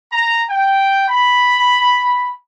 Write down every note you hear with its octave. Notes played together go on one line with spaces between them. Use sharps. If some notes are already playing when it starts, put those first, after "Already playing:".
A#5
G5
B5